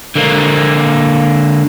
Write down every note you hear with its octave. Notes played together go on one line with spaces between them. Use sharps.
D3 A#3